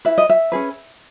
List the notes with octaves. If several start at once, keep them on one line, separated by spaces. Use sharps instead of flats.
E4 B4 E5
D#5
E5
C#4 G#4 B4